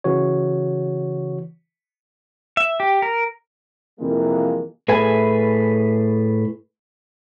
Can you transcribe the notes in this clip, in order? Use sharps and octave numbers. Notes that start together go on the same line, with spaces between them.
C#3 E3 F#4 C#5
E5
G4
A#4
F2 C3 E3 G3 G#3 A#3
A2 G#4 A4 B4 E5 G#5